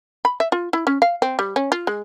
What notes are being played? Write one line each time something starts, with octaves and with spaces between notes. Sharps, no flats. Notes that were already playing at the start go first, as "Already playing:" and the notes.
B5
E5
F4
E4
C#4
F5
C4
G3
C#4
F4
G#3